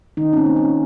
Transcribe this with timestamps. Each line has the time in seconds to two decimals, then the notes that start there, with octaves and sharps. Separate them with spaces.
0.17 D#3 D#4
0.33 C#4
0.37 C4
0.46 A#3
0.56 C#4